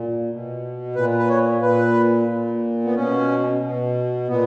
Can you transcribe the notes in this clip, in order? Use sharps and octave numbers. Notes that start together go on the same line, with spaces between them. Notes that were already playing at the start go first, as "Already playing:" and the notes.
Already playing: A#2
B2
A#2 B4
B4
C#5
A#2 B4
A#2
B3
B2 C#4
B2
A#2 B3